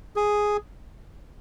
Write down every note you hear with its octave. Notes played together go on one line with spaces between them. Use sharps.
G#4